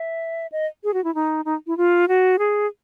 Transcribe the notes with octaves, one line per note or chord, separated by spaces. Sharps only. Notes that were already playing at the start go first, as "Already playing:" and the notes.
Already playing: E5
D#5
G#4
F#4
E4
D#4
D#4
E4
F4
F#4
G#4